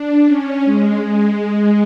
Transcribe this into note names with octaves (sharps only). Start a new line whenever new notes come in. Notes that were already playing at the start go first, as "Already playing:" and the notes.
Already playing: D4
C#4
G#3
G#3